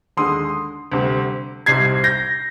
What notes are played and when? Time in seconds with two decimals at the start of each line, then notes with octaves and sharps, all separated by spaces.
0.17 D#2 D3 G#3 C6 D#6
0.92 D2 C3 G3
1.66 C2 C3 G3 C4 D#4 G#6 C7
2.04 G6 A#6